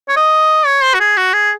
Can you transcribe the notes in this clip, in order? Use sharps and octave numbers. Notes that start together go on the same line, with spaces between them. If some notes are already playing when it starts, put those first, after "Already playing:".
C#5
D#5
C#5
C5
F#4
G#4
F#4
G#4